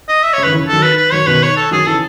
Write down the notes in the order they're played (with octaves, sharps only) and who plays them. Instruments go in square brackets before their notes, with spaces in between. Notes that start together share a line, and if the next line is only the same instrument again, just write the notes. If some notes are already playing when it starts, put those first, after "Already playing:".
[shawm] D#5
E5
[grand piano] C#3 [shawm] C#5
[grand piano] D#3 [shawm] B4
[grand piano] C#3 E3
[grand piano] D#3 F#3 [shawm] A4
[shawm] B4
B4
[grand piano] D#3 F#3 [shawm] C#5
[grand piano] B2 D#3 [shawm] B4
[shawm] C#5
A4
[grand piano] D#3 F#3 [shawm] G#4
[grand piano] C#3 E3 [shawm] A4